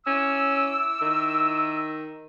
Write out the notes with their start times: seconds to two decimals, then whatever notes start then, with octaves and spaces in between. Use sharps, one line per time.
0.07 C#4 E4 D6 E6
1.02 D#3